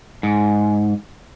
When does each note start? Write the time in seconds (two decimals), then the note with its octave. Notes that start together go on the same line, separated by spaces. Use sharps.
0.23 G#2